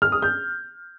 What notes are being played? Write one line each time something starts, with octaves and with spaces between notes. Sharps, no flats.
F6
D#6
G6